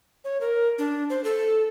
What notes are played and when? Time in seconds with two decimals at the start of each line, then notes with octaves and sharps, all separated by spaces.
0.24 C#5
0.41 A#4
0.79 D4
1.10 C5
1.24 A4